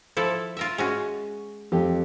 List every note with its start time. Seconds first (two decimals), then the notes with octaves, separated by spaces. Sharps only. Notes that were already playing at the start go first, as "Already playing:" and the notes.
0.17 F3 E4 A4
0.57 F4 A#4 E5
0.78 G#3 C#4 F#4
1.72 F2 G4